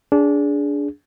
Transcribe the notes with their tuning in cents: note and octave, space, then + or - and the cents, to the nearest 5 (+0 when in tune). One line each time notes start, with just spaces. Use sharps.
D4 -20 G#4 +0